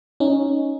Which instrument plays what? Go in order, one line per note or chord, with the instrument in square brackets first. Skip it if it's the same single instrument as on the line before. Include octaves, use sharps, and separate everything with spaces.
[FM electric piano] C#4 D#4